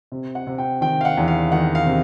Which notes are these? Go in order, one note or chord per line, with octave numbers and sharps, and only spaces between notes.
C3
F#5
C3
G5
D#3 G5
F5
F#5
E2
F5
D#3 F#5
F5
C3